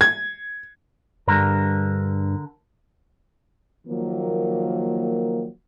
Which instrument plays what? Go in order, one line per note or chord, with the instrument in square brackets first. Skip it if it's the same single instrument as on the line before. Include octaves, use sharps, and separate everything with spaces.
[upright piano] G#6
[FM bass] G2 [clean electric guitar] D3 A#4
[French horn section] D#3 F3 F#3 A#3